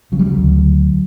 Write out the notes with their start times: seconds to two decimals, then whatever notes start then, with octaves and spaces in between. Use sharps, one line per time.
0.12 C#3 F#3
0.19 G3
0.26 F#3
0.37 D2